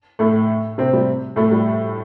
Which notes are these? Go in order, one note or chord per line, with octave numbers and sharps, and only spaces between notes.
A2 A3
C3 C4
G3
A2 A3
G3